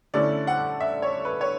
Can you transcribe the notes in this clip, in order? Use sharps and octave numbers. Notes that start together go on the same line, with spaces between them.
D3 A3 C#4 E4 D5
F#5
E5
C#5
B4
C#5